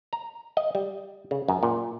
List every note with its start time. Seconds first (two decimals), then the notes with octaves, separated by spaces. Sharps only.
0.13 A#5
0.57 D#5
0.75 G3
1.31 C#3
1.48 F#2
1.63 A#2